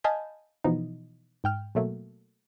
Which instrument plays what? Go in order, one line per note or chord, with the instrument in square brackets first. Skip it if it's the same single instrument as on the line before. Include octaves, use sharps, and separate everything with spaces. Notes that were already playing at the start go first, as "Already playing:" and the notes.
[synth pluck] D#5 F5 G#5 A5 B5 G6
B2 E3 F3 D#4
G#2 G5 F6
B2 F#3 A3 A#3